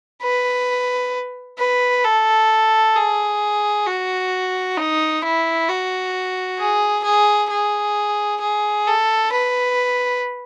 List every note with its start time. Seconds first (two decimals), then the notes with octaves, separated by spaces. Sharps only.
0.23 B4
1.59 B4
2.04 A4
2.95 G#4
3.87 F#4
4.77 D#4
5.22 E4
5.68 F#4
6.59 G#4
7.04 G#4
7.50 G#4
8.41 G#4
8.87 A4
9.32 B4